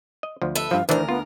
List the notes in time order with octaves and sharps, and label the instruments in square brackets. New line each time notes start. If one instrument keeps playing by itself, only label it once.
[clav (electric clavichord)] D#5
D2 F3
[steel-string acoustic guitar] A4 B4 E5
[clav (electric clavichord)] G2 F3 [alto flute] F5
[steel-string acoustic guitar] D2 A#4 [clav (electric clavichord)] D#3 E3 D4 [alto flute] C5
[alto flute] B3 [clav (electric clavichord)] F4